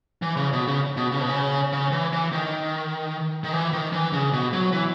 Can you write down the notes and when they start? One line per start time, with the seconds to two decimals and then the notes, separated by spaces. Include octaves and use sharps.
0.22 E3
0.37 C#3
0.53 B2
0.67 C#3
0.97 B2
1.12 C#3
1.21 B2
1.29 C#3
1.73 C#3
1.92 E3
2.13 E3
2.33 D#3
3.44 D#3
3.53 E3
3.73 D#3
3.93 E3
4.13 C#3
4.33 B2
4.53 F#3
4.73 E3